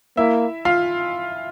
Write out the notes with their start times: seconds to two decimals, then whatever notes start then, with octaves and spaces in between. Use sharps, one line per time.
0.17 A#3 E4 E5
0.65 F4 F5